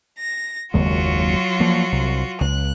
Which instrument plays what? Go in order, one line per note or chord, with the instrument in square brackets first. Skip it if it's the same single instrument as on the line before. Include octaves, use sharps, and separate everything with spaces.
[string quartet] A#6
[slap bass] F#1 D#2 G#3 [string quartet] F#3 F4 F#4
[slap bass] F3 A#3
C2
[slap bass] C#2 [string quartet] F#6